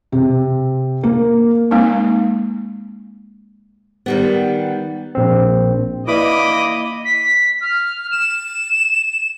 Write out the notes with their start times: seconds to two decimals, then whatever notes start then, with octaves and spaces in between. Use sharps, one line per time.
0.12 C3
1.03 A#3
1.71 G#3 A#3 C4 D#4
4.06 D#3 G3 B3
5.15 A#1 C4
6.08 A#3 E4 B4 D5 D#5 B5 D6 D#6
7.05 B6
7.61 F6
8.12 E7